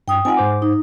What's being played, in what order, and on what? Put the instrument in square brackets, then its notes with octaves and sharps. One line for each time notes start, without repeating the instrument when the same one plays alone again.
[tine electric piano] G2 [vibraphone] G5 D#6
[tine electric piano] C4 D#4 F4 [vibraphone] F#5 G#5
[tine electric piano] G#2 C5 D6
[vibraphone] D#4